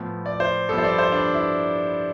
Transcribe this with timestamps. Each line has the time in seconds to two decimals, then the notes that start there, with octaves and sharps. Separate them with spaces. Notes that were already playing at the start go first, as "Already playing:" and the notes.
Already playing: A2 F3 B3
0.26 D5
0.40 C5
0.69 G2 F3 B3 A4
0.78 C5
0.84 D5
0.98 C5
1.12 D4
1.34 E4